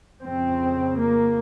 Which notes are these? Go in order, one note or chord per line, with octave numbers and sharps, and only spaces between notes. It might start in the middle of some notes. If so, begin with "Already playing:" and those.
F2 C#3 C4
A#3